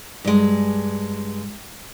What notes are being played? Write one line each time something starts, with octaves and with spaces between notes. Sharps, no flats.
G2 G#3